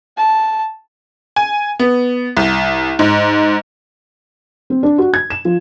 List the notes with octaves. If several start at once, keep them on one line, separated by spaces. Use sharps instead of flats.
A5
G#5
B3
C2
G#2
C4
D4
F#4
G#6
E7
F3